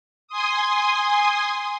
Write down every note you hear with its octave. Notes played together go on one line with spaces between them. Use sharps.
G#5 C6 D#6